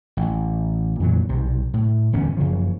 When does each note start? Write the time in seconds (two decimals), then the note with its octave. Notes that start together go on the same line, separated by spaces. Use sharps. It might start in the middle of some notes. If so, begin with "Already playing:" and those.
0.17 A1
1.00 F2 A#2 E3 F#3
1.29 B1 C3
1.74 A2
2.12 D1 G1 E2 C#4
2.37 F#1 C#3 F3